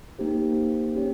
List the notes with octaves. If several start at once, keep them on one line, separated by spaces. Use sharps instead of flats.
A#3 D#4 G4 C5
C#4 G4 C#5